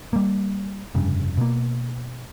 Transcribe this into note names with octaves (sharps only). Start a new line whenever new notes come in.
G3 A#3
F1 G2 C#3
B2 A#3